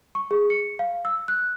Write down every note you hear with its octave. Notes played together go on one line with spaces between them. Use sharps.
C#6
G#4
C#7
F5
E6
F#6